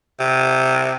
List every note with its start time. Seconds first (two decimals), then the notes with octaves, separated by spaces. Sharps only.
0.20 C3